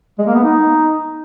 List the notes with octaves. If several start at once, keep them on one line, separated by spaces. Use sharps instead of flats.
G#3
A#3
B3
D#4